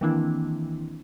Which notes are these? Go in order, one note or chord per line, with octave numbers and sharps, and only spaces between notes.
D#3 E3 A#3 C4 D4 E4